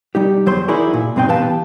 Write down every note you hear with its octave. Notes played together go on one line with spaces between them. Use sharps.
G3 D#4 G4
E2 F#3 C5 C6
D#4 E4 F#4 G#4 A#4 D5
A#2
G2 B2 C4 D#4 G5
E3 B3 G4 B4 F5 A5